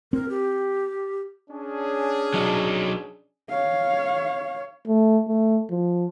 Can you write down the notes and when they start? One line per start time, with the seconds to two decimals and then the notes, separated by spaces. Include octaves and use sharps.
0.13 C4 A#4
0.29 G4
1.51 C#4 D4 G#4
2.34 F#3 D#4
3.50 C#5 F5
4.87 A3
5.28 A3
5.71 F3